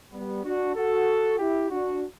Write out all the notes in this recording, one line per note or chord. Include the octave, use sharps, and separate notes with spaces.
G3 B3
D4 F#4
F#4 A4
E4 G4
D4 F#4